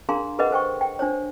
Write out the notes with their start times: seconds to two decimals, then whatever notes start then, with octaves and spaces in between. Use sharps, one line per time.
0.09 D4 G#4 A#4 F5 A#5 C6
0.39 G#4 A#4 B4 D#5 F#5
0.51 A4 C5 G5 C#6
0.81 G5
0.99 D4 C5 C#5